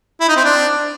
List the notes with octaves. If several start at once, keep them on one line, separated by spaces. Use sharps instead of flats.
E4
D#4
C4
D4